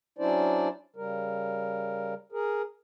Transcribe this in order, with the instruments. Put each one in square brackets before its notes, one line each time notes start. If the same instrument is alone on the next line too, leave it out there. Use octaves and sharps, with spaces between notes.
[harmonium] F#3 C#4 D4 E4 C5 D5
C#3 G3 A#4
G#4 A#4